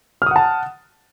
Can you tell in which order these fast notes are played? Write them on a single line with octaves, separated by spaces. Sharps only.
F6 D#6 F#5 A5